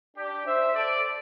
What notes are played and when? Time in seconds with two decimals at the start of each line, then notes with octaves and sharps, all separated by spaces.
0.17 D4 G4
0.46 C5 E5
0.75 A4 D5